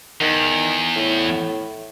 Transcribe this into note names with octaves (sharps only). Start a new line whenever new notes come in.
E2 D#3
A2